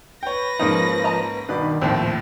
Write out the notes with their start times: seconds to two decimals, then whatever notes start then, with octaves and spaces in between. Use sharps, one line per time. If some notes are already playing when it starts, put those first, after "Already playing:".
0.23 B4 C#5 G5 A#6
0.59 G#2 F3 A#3 C#4 D#4
1.04 D#5 A5 A#5
1.49 G2 B2 D#3 B4 D5
1.82 A#1 D#2 A2 F3 C4